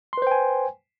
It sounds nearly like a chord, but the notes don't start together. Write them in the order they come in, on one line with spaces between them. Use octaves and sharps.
C6 B4 C5 G5 G#5